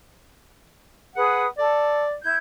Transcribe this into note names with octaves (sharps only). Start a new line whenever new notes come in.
G#4 B4 F#5 D#6
A4 D5
E4 G6 G#6